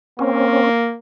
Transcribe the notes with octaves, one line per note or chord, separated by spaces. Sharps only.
A#3 C4 C#4